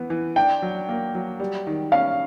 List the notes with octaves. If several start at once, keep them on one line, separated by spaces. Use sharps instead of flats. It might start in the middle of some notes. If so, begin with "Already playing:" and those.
Already playing: E3 B3
E3
D4 G5
F#3
A#3
F#3
G3
D#3
C#4 F5